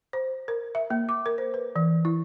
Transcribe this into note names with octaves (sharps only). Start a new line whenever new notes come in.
C5
A#4
E5
A#3
D6
A#4
C5
B4
E3
E4